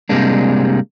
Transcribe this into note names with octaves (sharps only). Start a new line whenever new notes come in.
C3 G3 G#3 A#3 D4